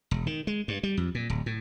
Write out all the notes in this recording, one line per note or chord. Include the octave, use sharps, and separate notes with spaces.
E1
D#3
G#3
G2
G3
F2
A#2
D1
A2